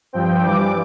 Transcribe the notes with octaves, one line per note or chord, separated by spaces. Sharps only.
G2 F3 C4 G5
G2 E3 G3 D6